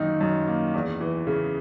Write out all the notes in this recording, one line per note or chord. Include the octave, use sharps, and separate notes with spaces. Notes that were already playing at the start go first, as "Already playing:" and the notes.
Already playing: F#2 D#3 A#3 D#4
F#2
A#3
E2
E3
C#3